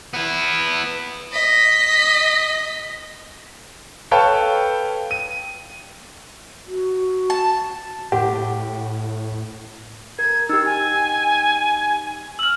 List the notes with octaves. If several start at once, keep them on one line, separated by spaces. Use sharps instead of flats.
B3 E4
D#5 B6
A4 B4 C#5 F5 G5 A5
D#7
F#4
A5
A2 G4 F#5
A#4 G#6
D#4 G4 E6
G#5
E6 F6 F#7